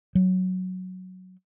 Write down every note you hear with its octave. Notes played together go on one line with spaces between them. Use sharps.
F#3